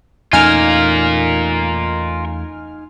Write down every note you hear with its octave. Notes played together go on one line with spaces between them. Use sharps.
E2 A3 C#4 D#4 F4 A#4 G#5 F6